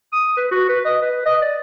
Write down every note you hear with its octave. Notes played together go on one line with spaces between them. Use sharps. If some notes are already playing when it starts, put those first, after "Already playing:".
D#6
B4
F#4
B4
D#5
B4
D#5
D5